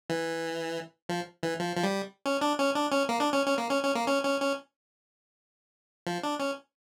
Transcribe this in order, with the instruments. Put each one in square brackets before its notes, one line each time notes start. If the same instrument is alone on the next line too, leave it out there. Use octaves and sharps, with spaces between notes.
[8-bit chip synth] E3
F3
E3
F3
F3
G3
C#4
D4
C#4
D4
C#4
A#3
D4
C#4
C#4
A#3
C#4
C#4
A#3
C#4
C#4
C#4
F3
D4
C#4